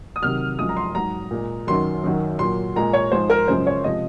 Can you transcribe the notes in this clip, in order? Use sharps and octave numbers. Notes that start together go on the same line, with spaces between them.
D#6
C3 D#3 F#3 F6
F#2 F3 G#3 D#6
A#5
C6
G#2 F#3 A#5
A#2 G#3
F#2 D#3 F#3 C6
F#2 D#3 F#3
A#2 F#3 C6
A#2 G#3 A#5
C#5
G#2 F3 G#3 C5
A#4
F#2 C#3 F3 G#3 C5
C#5
C3 F3 G#3 D#5